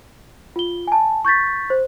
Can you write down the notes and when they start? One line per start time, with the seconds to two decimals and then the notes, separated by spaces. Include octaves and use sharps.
0.56 F4 G7
0.87 G#5 A5
1.25 C#6 G6 A6 B6
1.70 C5